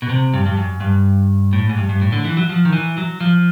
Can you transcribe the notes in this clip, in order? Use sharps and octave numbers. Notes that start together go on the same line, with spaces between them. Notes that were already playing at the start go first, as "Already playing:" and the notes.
B2
C3
G2
G2
F#2
G2
A2
G#2
G2
G2
A2
D3
E3
F#3
F3
D#3
E3
F#3
F3